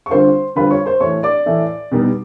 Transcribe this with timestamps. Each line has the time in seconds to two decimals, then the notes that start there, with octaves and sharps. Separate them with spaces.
0.06 C#6
0.10 D3 G3 C4 F4 C5 C6
0.56 D3 G3 C4 F4 B4 B5
0.71 C#5 C#6
0.86 C5 C6
1.00 A2 E3 A3 C#5 C#6
1.23 D5 D6
1.46 A2 E3 A3
1.91 B2 G3 B3 D#4